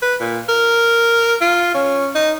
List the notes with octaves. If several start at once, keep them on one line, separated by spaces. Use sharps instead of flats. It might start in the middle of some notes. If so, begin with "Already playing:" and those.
B4
A#2
A#4
F4
C#4
D#4